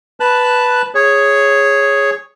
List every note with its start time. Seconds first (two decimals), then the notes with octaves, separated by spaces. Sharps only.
0.20 B4 A5 F#6
0.95 G#4 C#5